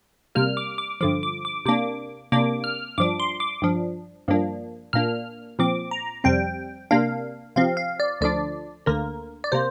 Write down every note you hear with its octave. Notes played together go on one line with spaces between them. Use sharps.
C3 G3 A#3 F6
D6
D6
G2 D3 F3 D6
D6
D6
C3 A#3 D4 D6
C3 A#3 D4 D6
F6
G2 F3 D4 D6
C6
D6
G2 F3 D4
G2 F3 A#3 D4
A#2 A#3 D4 F6
A#2 F3 C4 D6
A#5
F2 C3 G3 C4 G5
C3 A#3 D4 F5
C3 F3 C4 F5
F5
D5
D2 D3 F3 D4 D5
D2 D3 A#3 A#4
D5
C3 A#3 C5